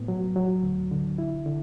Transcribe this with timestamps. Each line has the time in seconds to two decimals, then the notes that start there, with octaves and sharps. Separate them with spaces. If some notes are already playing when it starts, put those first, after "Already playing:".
Already playing: A2 B3
0.08 F#3
0.36 F#3
0.63 D2
0.91 D3
1.18 E4
1.46 D3